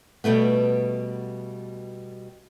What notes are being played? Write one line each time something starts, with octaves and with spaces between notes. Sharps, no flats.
B2 G3 A3 B3